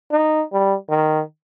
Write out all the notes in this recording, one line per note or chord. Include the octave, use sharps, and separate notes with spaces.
D#4
G3
D#3